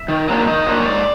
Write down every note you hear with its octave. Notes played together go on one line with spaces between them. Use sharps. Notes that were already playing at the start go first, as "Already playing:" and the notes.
Already playing: E5
D#3
F#3 A#3 D4
D#3 D#5
F#3 A#3 D4
C#5
G#2 D5